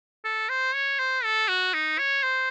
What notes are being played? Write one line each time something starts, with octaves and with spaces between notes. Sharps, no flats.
A4
C5
C#5
C5
A4
F#4
D#4
C#5
C5